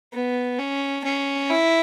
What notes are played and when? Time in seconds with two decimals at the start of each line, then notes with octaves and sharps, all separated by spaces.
0.13 B3
0.59 C#4
1.04 C#4
1.50 E4